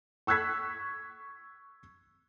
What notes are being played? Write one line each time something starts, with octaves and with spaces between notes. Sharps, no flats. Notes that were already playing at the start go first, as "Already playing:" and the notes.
C#6 E6 F#6 G#6 B6